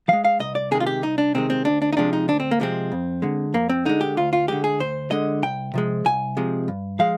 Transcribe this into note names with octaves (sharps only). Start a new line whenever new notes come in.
F3 G#3 F5
F5
C2 D#5
D5
C3 D#3 G#3 G#4
F4
G4
C2 D#4
D4
C3 D#3 G#3 C4
C4
D2 D4
D4
D#4
C3 F3 G#3 D4
D#4
D2 D4
C4
A#3
C3 F3 G#3 C4
F2
D3 G#3
F2 A#3
C4
D3 G#3 D#4
G4
D2 F4
F4
D3 G#3 G4
G#4
D2 C5
D3 G#3 D#5
C2 G5
C3 F3 G#3
C2 G#5
C3 F3 G#3
G2
F3 G#3 F5